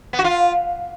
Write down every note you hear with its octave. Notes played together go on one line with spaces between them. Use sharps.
B3
F#4
F4